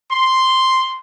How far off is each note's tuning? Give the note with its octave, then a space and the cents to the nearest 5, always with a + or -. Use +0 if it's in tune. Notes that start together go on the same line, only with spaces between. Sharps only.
C6 +0